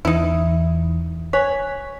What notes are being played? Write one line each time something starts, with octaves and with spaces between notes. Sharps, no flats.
E2 E3 D#4 E4
C#5 G#5 F#6 B6